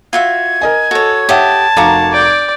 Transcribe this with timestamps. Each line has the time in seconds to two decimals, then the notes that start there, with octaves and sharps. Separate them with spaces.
0.13 F4 F#4 E5 G#6
0.61 A#4 D#5 G#5
0.91 F#4 A4 C#5
1.29 G4 C#5 E5 F#5 A5 D#6
1.77 F1 F#4 A#4 F5 A#5 D6
2.12 D5 G5